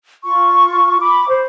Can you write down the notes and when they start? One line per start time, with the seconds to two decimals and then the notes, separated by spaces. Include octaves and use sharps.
0.24 F4 C#6
1.01 B5 D6
1.28 C5